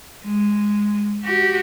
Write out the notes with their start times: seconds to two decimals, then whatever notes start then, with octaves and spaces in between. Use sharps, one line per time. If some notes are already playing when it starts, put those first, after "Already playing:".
0.24 G#3
1.24 F#4 G4